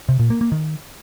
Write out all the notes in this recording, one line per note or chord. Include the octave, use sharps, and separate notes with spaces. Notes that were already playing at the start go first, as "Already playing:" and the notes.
C3
A#2
A#3
A#3
D#3